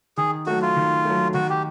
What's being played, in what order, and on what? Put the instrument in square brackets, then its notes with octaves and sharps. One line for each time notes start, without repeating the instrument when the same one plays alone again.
[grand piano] D#3 [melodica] G#4
[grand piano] F#3 A3 [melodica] F#4
[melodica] F4
[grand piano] D#3
F#3 A3
[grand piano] D#3 [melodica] F#4
[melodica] G4